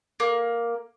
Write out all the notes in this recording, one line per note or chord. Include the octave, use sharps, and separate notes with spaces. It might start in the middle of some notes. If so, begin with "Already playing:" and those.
A#3